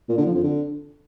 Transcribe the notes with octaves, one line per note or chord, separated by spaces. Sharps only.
A#2
D3
F3
F2
D3